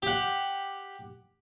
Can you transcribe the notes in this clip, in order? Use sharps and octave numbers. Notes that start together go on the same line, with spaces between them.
G4 F#5